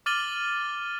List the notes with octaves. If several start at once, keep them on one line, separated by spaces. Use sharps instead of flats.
D6 F6 A6 D#7 F#7 G7